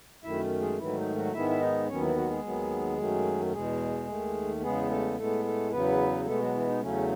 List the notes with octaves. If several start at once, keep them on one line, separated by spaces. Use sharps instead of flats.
F#2 D#3 A3 E4 E5
G#3 G#4
G#2 D#3 E3 F#3 A3 E4
D#4
F#3 F#4
G#2 D#3 G#3 B3 E4 E5
E5
D#4 D#5
D#2 D#3 F#3 B3 C#4 C#5
E3 E4
F#3 F#4
G#3 G#4
D#2 D#3 F#3 B3
F#2 D#3 F#3 A3
E2 B2 G#3 G#4
D#2 D#3 A3
E2 C#3 G#3 B3 G#4
A3 A4
A2 G#3 A3 B3 A4
A3 A4
E2 C#3 F#3 B3 B4
B2 G#3 A3 B3 A4
F#3 F#4
E3 E4
D#4
E2 C#3 F#3 A3 C#4